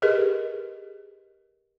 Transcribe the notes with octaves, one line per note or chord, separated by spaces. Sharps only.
G4 G#4 A#4 B4 D#5